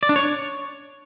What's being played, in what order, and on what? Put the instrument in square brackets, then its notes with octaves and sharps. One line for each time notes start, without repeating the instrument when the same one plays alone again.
[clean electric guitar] D5
D4
C#5